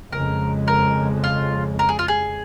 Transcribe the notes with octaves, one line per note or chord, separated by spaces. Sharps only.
F2 C#3 G#3 A#4
A#4
F4
A#4
G#4
F4
G#4